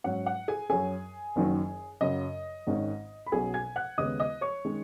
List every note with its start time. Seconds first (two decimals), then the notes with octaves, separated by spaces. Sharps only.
0.04 G#2 F#3 C#4 F#5
0.26 F#5
0.48 G#4 G#5
0.70 F#2 F#3 C#4 G#4 G#5
1.36 F#1 F#2 D#3 F#3 C#4
2.01 F#2 C#3 F#3 D#5
2.67 G#1 G#2 D#3 G#3 C#4
3.26 B5
3.32 B1 B2 F#3 C#4 G#4 G#5
3.54 G#5 G#6
3.76 F#5 F#6
3.98 D#2 C#3 G#3 B3 D#5 D#6
4.20 D#5 D#6
4.41 C#5 C#6
4.65 D#3 G#3 C#4